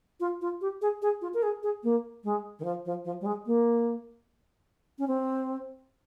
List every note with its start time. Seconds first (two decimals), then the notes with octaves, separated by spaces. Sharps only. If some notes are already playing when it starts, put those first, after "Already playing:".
0.20 F4
0.41 F4
0.61 G4
0.82 G#4
1.02 G#4
1.22 F4
1.34 A#4
1.43 G#4
1.63 G#4
1.84 A#3
2.24 G#3
2.59 D#3
2.64 F3
2.85 F3
3.05 F3
3.21 G3
3.26 G#3
3.46 A#3
4.99 C#4
5.08 C4